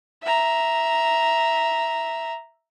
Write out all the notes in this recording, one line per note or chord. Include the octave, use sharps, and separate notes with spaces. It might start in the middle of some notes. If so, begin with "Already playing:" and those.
E5 A#5